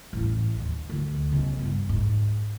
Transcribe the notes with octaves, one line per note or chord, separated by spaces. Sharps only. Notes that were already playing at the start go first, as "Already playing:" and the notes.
A1 E2
D#2
D2
B1 C#3
G1 B3
G#2